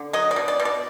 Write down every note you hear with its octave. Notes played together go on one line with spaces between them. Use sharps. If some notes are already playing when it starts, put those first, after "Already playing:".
Already playing: D3
F#3 D#5
D5
B2
D5
B2
D5